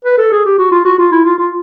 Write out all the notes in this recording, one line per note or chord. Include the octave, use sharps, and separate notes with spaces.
B4
A4
G#4
G4
F#4
F4
F#4
F4
E4
F4
F4